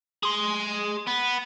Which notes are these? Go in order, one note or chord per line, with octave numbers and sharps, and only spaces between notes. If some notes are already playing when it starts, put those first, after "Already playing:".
G#4 C6
B3